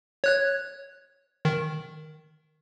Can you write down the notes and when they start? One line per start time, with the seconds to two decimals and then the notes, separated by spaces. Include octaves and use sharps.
0.24 C#5 F#6 G#6
1.45 D#3